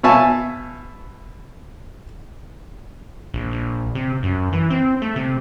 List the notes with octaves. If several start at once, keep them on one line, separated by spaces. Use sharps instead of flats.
B2 C#5 E5 G#5 A5
A#1
A#1
C3
F#2
E3
C4
A3
C3